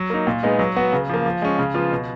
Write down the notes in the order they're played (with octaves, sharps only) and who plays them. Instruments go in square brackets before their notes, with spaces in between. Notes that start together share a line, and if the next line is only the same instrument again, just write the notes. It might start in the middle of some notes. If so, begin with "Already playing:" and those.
Already playing: [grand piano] F#3
A#3 D#4
A#2
G#3 B3 D#4
F#3
B3 F#4
C#3
F3 A#3
F3
G#3 C#4
C#3
F3 B3 F4
B2